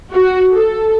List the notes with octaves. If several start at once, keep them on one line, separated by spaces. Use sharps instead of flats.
F#4
A4